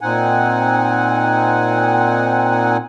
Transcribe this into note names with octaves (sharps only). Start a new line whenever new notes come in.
A#2 C4 D#4 F#5 G#5